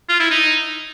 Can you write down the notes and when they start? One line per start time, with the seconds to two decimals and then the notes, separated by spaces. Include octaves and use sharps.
0.09 F4
0.20 E4
0.31 D#4